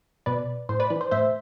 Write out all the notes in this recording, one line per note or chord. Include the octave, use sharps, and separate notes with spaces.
B2 B4 D5
A2 C5
B4 D5
E3 B4
C5
A2 C5 E5